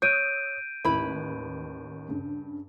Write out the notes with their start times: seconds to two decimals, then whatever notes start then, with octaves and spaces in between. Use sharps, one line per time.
0.02 C#5 D#6 E6 F#6 G6 D7 D#7
0.85 A1 D#2 E4 B4 B5
2.09 G2 C#3